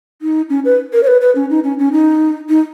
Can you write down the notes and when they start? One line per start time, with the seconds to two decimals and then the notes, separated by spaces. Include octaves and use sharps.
0.22 D#4
0.50 C#4
0.65 B4
0.93 A#4
1.03 C#5
1.07 B4
1.21 B4
1.35 C#4
1.50 D#4
1.64 C#4
1.79 C#4
1.92 D#4
2.49 D#4